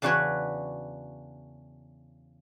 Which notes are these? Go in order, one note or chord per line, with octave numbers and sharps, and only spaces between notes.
E2 C#3 D4 F#4 B4 C#5